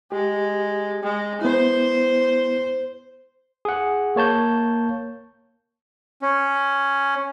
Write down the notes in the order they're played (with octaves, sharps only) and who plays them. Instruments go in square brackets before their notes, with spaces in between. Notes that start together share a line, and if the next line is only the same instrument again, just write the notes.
[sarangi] G#3 [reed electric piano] G4
[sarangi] G#3
[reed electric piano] B3 E4 [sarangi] C5
[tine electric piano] G#4 F#5
A#3 C#5 A5 G6
[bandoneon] C#4